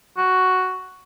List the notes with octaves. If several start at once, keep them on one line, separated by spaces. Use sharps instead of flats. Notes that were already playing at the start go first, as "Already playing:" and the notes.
F#4